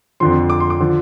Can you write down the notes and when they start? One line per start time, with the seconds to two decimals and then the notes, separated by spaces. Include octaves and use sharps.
0.20 F2 D3 F3 C6
0.50 D6
0.60 C6
0.70 D6
0.80 D3 F3